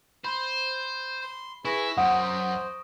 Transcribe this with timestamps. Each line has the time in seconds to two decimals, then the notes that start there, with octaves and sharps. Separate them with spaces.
0.25 C5 B5
1.21 C6
1.65 E4 G#4 B4 C#6 A#6
1.97 F#2 C5 F#5 D#6 D7